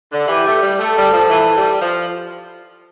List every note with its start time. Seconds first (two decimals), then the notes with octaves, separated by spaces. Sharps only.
0.11 D3
0.28 E3 G4
0.45 A3
0.61 G3
0.79 A3 A4
0.96 G3
1.13 F3
1.30 E3 A4
1.56 G3
1.81 F3